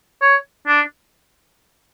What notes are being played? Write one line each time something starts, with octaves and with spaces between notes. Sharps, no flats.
C#5
D4